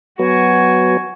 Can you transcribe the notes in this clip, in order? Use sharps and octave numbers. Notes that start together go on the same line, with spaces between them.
F#3 B3 F#4 G#5